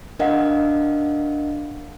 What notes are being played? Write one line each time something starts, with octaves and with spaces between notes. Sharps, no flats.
D4 A#4 D#5 F5 F#5